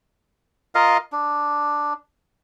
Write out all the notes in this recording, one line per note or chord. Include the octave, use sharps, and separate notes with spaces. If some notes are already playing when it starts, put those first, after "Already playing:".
F4 A#4 D#5 F5
D4